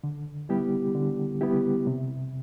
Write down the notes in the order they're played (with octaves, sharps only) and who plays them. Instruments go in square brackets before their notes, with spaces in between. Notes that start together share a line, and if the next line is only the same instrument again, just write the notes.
[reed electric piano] D3
G3 B3 E4 G4
D3
G3 B3 E4 G4
C3